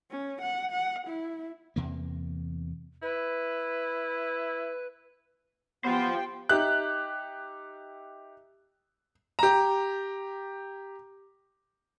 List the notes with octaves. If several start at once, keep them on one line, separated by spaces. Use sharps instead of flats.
C#4
F#5
F#5
E4
E2 C3 A#3
E4 B4
B3 F4 G4 C5 G5 C6
D#4 G4 E5 F#6
G4 A#5